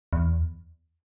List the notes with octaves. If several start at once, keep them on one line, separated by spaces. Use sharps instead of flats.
E2